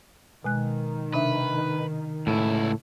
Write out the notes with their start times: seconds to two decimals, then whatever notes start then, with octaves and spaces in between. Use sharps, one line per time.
0.44 B2 D#3 G#3 F#6
1.14 C3 D4 B4 E5
2.27 C#2 A2 E4